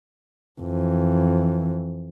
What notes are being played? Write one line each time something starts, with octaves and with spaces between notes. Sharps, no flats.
F2 E3